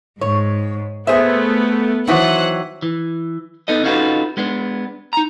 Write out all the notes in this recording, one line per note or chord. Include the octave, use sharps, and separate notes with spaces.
G#2 C#5
A3 B3 G#4 C5 E5
D#3 E3 F#3 C5 F#5
E3
B3 D#4 A4 D#5
C#4 D#4 F4 F#4 A4 B4
G#3 B3 D4
D#4 A#5